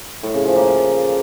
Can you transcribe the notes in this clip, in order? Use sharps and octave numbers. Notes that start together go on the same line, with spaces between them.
A2
C#3
F3
A#3